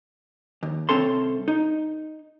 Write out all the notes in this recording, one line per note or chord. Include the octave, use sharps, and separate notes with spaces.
D#2
C2 D3 C4 C#4 A4 C6
D#4